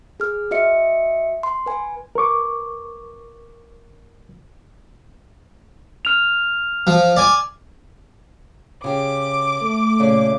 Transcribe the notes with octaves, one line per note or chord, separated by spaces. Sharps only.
G#4 F6
F#4 D#5 E5 C#7
C6
B4 G#5
A#4 B4 C#6 D6
F6 F7
F3
D5 G#5
C#3 G4 D6
A3
A#2 C#3 A3